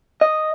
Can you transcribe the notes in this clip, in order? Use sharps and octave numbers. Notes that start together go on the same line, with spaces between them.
D#5